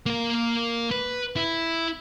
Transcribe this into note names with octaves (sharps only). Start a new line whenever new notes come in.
A#3 A#4
B4
E4